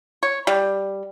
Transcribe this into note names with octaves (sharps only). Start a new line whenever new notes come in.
C#5
G3